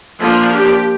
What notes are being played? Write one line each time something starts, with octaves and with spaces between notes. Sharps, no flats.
F3 A#3 D4 F4
G4